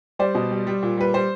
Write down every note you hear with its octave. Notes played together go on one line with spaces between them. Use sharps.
G3 C5 D5
B2
G3
G3
A#2
G3 B4
G3 C5